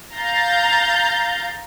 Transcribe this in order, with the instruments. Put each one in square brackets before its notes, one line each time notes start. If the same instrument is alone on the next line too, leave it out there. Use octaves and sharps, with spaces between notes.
[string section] F5 A#5 G6 A6